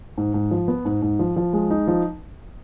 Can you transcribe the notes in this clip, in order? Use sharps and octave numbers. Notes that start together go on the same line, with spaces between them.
G#2
G#2
F3
B3
G#2
G#2
F3
F3
G#3
D#4
F3